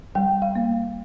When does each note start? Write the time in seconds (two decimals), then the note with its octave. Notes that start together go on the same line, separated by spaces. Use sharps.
0.15 G3 G5
0.42 F5
0.55 A#3